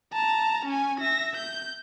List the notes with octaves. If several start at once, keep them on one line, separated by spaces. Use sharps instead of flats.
A5 A#5
C#4 G#5
E5 A#6
G6